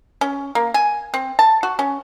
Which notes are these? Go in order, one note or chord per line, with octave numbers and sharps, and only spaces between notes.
C#4
A#3
G#5
C4
A5
F#4
C#4